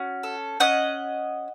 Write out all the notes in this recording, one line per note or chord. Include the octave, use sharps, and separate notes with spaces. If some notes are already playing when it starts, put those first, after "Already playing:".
Already playing: C#4 F#4
A4
C#4 D#5 F#5